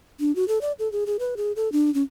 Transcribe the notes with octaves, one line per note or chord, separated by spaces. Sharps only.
D4
F#4
A4
D5
A4
G#4
G#4
B4
G#4
A4
D4
C#4